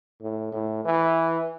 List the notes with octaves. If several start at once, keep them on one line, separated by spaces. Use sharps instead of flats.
A2
A2
E3